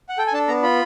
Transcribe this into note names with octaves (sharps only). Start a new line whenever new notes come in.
F#5
A4 G5
G#5
D4 A5
B3 A#5
F4 B5